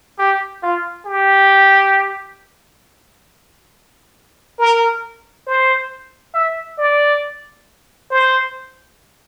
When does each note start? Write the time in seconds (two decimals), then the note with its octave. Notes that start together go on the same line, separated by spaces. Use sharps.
0.19 G4
0.63 F4
1.06 G4
4.58 A#4
5.47 C5
6.34 E5
6.78 D5
8.11 C5